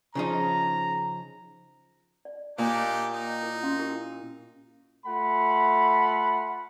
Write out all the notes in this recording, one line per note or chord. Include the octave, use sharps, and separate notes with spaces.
C#3 F3 D#4 A#5
D5
A#2 D4 D#4 G4
D#4
E4 A#4
C#4 F5 C6
E4 G4 A#4
A3 F4 F#5 B5